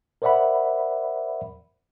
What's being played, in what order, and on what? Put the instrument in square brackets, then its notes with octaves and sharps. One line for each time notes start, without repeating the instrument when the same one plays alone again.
[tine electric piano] A#4 C5 D5 E5 F#5 B5